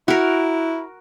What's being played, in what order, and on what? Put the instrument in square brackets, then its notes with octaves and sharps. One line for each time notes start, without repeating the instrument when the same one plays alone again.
[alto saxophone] E4 [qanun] F#4 A#4